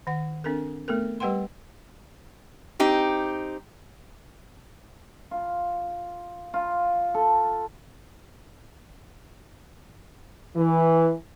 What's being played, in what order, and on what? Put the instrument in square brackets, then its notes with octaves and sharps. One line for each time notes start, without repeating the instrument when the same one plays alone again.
[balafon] D#3 F#5
C4 D4 A4 A#4
A3 B3 A4 A#4
G3 G4 B4 F#5 G5 C6
[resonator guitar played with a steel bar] C4 D#4 G4
[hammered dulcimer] F4
F4
A4
[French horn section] E3